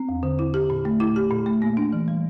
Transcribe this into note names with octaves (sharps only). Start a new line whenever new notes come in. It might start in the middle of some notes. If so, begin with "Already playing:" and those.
Already playing: C4
E2
D3
E4
G4
A#2
A3
E4
G4
A#2
A3
A#3
D4
E3
G3